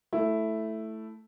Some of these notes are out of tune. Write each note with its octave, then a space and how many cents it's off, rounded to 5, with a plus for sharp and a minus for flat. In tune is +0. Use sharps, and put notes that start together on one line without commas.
A3 +0 E4 +0